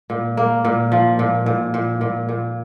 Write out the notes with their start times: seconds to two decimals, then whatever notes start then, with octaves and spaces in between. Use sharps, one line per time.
0.10 A#2
0.37 A#3
0.65 A#2
0.92 F3
1.19 A#2
1.46 A#2
1.74 A#2
2.01 A#2
2.29 A#2